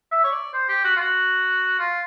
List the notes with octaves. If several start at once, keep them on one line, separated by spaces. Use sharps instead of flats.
E5
C#5
D5
C5
G4
F#4
F4
F#4
F4